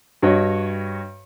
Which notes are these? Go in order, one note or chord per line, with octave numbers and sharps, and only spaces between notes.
G2 F#4 C#5 D#5